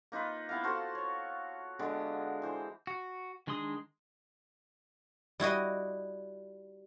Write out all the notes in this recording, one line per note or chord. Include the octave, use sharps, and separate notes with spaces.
A#3 D#4 F4 B4
B3 E4 A#4 F5
F4 F#4 A4 C5
C#5
D3 G#3 B3
E3 C5
F#4
D#3 G#3 D4 C6 D#6
G3 E4 F#4 D#5